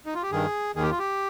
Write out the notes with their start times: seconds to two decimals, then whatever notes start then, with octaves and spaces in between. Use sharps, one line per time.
0.06 D#4
0.14 F4
0.23 G4
0.31 G2 D#3 G#4
0.76 D#2 D#3 G#4
0.83 G4
0.91 F4
0.99 G4